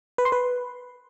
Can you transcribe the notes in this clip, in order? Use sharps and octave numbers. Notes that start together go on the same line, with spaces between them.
B4
C6
B4